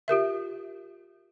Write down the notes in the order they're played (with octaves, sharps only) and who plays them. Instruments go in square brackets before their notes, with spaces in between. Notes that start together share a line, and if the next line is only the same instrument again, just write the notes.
[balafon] F4 G4 A#4 E5